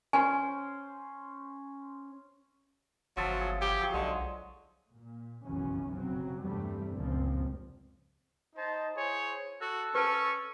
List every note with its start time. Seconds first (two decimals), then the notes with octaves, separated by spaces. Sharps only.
0.13 C#4 C5 G#5
3.17 G1 F3 F#3 E5 A5
3.41 G#4
3.61 G4
3.80 F#3 G#4 C#6
3.93 B1 D3 G#3
4.93 A#2
5.45 F1 B1 F#2 C#3 E3 C#4
5.94 F1 C#3 F#3 C4
6.43 E2 G2 C3 G3 A3 C4
6.93 F#1 C#2 G2 A#2 F3 C4
8.56 D#4 C5 D#5 A5
8.96 E4 G#4 C5 C#5
9.61 F#4 A4
9.95 C#4 B4 A5 C#6